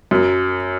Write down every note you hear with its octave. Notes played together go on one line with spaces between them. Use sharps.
F#2